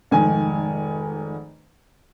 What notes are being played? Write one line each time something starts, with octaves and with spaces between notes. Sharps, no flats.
F1 G#2 D#3 G#5